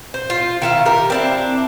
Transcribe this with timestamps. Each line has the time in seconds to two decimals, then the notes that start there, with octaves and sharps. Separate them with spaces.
0.14 C5
0.30 F4
0.62 D#3 E4 F5
0.85 G4 A#4
1.10 C4 D4 E4